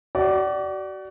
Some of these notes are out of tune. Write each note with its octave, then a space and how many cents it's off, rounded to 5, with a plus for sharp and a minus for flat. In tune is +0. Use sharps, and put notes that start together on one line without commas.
F#4 +35 D5 +0